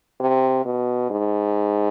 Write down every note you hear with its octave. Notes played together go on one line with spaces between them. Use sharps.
C3
B2
G#2